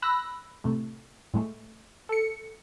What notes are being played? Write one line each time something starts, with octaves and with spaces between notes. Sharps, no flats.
B5 E6 F#6 A#6
A2 C3 A3
A2 G#3 A3
A4 C#7